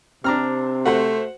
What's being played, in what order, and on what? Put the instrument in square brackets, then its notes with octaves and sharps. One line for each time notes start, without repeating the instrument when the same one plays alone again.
[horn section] C3 [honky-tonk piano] C4 [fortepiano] D4 A#5 F6
[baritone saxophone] A3 [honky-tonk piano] F#4 C5 [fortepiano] F#5